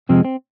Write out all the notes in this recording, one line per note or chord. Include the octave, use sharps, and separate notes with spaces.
F2 C3 F3 G#3 C4
C4